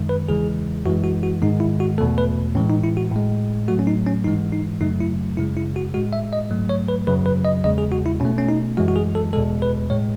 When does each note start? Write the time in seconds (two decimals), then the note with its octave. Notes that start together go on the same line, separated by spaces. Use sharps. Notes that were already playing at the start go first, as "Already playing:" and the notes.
Already playing: F#2 D#3 G#3
0.09 B4
0.28 E2 C#3 E3 G#3 G#4
0.86 F#2 E3 G#3 F#4
1.04 F#4
1.23 F#4
1.42 G#2 D#3 G#3 D#4
1.60 E4
1.80 F#4
1.98 E2 B2 A3 A4
2.18 B4
2.55 A2 E3 G#3 C#4
2.70 D#4
2.83 E4
2.97 F#4
3.11 A2 G#3
3.68 A2 F#3 A3 F#4
3.79 C#4
3.87 D#4
4.06 C#4
4.24 G#2 E3 G#3 D#4
4.53 D#4
4.81 F#2 C#3 F#3 A3 D#4
5.00 E4
5.37 F#2 C#3 G#3 E4
5.57 E4
5.76 F#4
5.94 A2 G#3 F#4
6.13 E5
6.33 D#5
6.51 G#2 F#3 A3
6.69 C#5
6.88 B4
7.07 F#2 C#3 F#3 B4
7.26 B4
7.45 D#5
7.64 E2 C#3 G#3 D#5
7.78 G#4
7.92 F#4
8.06 E4
8.20 B2 C#4
8.25 A3
8.38 C#4
8.49 D#4
8.77 F#2 E3 G#3 F#4
8.88 F#4
8.96 G#4
9.15 A4
9.33 E2 B2 G#3 A4
9.62 B4
9.90 A2 G#3 C#5